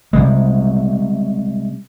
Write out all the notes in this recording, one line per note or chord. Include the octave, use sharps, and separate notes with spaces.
C3 G3 G#3